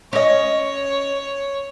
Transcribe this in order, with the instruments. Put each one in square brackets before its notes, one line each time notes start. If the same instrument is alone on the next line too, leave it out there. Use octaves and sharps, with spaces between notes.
[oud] C#4 D#5 [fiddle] C#5